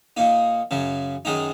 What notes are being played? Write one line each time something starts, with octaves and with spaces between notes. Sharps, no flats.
A#2 A#3 D#4
F#2 C#3 F#3
F#2 D#3 G#3 D#4